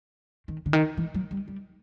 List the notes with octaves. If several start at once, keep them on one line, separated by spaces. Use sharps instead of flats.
D#3
D3
D#3
E3
F#3
G3
G3